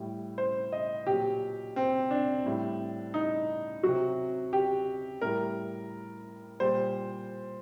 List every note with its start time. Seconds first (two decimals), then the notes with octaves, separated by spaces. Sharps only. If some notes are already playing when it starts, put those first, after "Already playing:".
Already playing: A2 G3
0.38 C5
0.72 D#5
1.07 A#2 F#3 G4
1.76 C4
2.10 D4
2.46 A2 G3
3.14 D#4
3.83 C3 F#3 F#4
4.53 G4
5.21 A2 G3 A#4
6.60 A#2 G3 C5